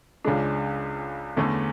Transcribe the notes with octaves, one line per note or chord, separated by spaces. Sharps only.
C#2 C#3 G#3 D4
E2 D3 A3 C#4